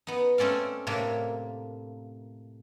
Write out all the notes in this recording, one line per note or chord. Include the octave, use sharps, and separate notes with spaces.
B3 D#4
A3 C4 C#4 D5 F5
A2 C3 A#3 D4